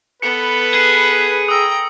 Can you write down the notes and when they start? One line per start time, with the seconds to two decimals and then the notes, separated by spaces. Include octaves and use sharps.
0.22 B3 A4 B4 C#7
0.74 G#4
1.48 G5 A#5 D#6 E6